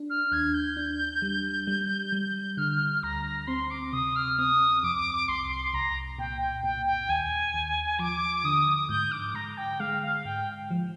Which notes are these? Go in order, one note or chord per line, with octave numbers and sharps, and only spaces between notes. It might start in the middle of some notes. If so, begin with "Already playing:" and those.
Already playing: D4
F6
D#2 G#6
G6
D4
G3
G3
G3
D3 F6
D2 A#5
C4 C6
D6
C3 D#6
F6
C4 D#6
F2 D6
C2 C6
C2 A#5
A#2 G5
G5
A#2 G5
G5
D#2 G#5
D#2
F3 D6
D3 D#6
G#2 G6
D6
G#2 A#5
G5
G#3 F5
F5
G#2 G5
F3